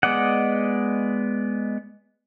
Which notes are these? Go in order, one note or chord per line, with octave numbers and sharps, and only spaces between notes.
G#3 B3 D5 D#5 F#5